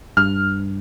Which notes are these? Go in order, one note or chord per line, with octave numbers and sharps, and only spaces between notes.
G2 F6